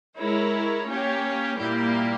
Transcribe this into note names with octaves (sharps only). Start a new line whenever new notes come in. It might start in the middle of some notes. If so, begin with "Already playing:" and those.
G#3 E4 A#4 C#5
A#3 C#4 G4 C#5
A#2 G3 A#3 E4 G4